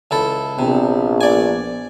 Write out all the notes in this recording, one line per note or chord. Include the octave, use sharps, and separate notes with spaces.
C#2 E4 A4
A#1 C3 B3
D5 G#5